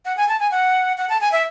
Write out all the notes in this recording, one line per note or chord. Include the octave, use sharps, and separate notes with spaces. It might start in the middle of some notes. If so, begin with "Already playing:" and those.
F#5
G#5
A5
G#5
F#5
F#5
A5
G#5
E5